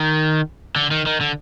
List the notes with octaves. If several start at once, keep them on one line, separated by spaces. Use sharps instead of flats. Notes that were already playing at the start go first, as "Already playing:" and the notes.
Already playing: D#3
D3
D#3
D#3
D3